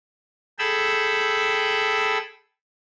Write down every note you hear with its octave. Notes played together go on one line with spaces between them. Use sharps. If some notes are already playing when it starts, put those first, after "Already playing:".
G#4 A4 G5 B5 E6